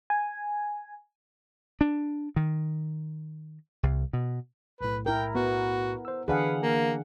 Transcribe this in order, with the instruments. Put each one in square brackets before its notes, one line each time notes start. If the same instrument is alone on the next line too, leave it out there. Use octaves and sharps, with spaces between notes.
[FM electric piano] G#5
[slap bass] D4
D#3
C2
B2
[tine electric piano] B1 A2 [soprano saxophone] B4
[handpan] E4 A#4 [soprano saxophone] G5
[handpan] B3 [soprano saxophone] F#4
[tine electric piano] C5 E6
[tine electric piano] D3 E3 D4 [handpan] G#4 F5 F#5 [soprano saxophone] B4
[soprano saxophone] A#3